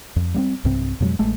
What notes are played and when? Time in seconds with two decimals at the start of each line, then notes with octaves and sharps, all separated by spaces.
0.16 F2
0.34 G3 A#3 C4
0.64 B1 G2 C3 C4
1.00 F2 B2 F#3 G#3
1.19 A1 G#3 A3